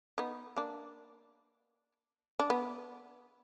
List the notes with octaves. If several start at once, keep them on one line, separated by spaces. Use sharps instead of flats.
B3 D#4
A#3 D4
D4
B3